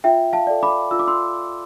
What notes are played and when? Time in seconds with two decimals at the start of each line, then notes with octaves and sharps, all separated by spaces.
0.04 F4 E5 G5
0.33 F5 A5
0.47 A4 D5
0.63 B5 D6
0.91 F4 E6
0.99 D6
1.07 C6 E6